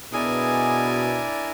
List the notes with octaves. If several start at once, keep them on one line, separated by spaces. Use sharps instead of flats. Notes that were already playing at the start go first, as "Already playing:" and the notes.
B2 D4 E4 G#4 A#4 D5 G#5